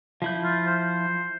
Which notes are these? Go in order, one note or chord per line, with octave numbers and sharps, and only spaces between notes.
F3 E4 G6
F4
C5